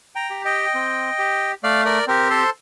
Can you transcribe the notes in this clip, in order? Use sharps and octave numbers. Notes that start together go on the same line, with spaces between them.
G5 A#5
G4
D#5 G5
C4
G4
A3 D5 F5
A#4 D5
C4 G4 A#4
A4 C5